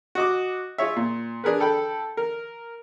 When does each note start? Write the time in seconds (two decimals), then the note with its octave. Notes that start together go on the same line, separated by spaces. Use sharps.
0.15 F#4 D#5 D6
0.78 F4 G#4 C#5 E5
0.96 A#2
1.44 D4 G#4 A#4 B4
1.60 A4 G5 B5
2.17 A#4